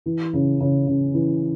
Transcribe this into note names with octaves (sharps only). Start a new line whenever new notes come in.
E3
C#3
C#3
C#3
E3